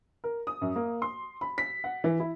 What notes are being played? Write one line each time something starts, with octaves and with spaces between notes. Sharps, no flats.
A#4
D#6
F#2
A#3
C6
B5
B6
F#5
E3
E4